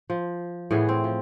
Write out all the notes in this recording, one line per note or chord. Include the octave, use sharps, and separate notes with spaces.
F3
A2 E3 B3 G#4
C4
F3